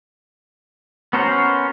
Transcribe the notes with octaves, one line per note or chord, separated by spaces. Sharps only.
B3 C#4 F#4 A#4 C5